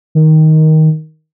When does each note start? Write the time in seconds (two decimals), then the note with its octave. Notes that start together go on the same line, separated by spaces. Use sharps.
0.15 D#3